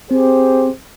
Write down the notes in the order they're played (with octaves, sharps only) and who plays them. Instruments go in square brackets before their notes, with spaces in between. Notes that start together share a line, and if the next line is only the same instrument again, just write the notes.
[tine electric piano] C4 [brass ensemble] G4 G#4 C5